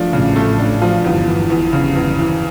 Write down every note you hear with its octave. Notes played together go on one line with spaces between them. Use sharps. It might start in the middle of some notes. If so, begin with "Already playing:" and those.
Already playing: F3 A3 D4
A1 A2 C#3
A3
D4
F3
G1 E2 G2
E3
G1 E2 G2
C#3
E2
E3